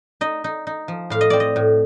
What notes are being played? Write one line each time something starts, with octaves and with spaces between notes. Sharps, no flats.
D#4 D#5
D#4
D#4
F3
A2 F5
D#5
C4 D5
D#5
A2